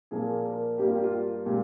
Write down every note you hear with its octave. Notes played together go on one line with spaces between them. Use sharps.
A#2 F3 A#3 G#4
A#4
G2 G3 A#3 G4
F4
G4
F4
A#2 F3 G#3 G4